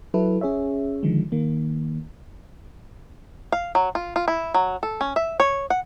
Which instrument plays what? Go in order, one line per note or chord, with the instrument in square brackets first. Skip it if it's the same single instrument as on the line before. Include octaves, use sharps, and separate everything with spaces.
[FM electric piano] F#3 E4 A4 B4
C#4 G#4 C#5 E5
D3 D#3 F3 G#3
D#3 A#3
[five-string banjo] F5
F#3
F4
F4
E4
F#3
A4
C#4
E5
C#5
F#5